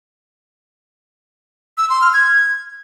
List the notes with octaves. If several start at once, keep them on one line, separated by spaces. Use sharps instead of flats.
E6
C6
F6
G#6